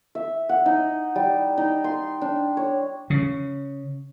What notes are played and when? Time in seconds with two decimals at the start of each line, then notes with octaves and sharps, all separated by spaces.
0.15 E5
0.49 F#5
0.66 D#4
1.16 G3
1.57 D#4
1.84 C6
2.22 D4
2.57 C#5
3.10 C#3